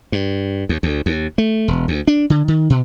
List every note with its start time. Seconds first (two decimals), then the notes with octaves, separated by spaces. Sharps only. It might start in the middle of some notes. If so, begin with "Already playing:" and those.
0.12 G2
0.69 D#2
0.83 D2
1.06 D#2
1.38 A3
1.68 E1
1.88 D2
2.08 D4
2.30 D3
2.48 D#3
2.70 B2